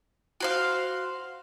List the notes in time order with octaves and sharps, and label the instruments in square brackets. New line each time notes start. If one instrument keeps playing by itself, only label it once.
[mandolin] F#4 C5 F5